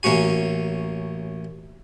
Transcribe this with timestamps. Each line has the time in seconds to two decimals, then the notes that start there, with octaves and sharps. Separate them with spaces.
0.03 A1 A#3 C#4 F#4 G#5